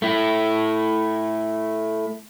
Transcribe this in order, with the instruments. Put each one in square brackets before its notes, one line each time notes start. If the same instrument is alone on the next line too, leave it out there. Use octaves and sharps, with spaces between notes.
[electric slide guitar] A3 E4